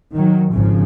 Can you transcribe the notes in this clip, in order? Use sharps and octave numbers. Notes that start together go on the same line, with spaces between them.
D#3 F#3
G#1 G#2 C#3 F3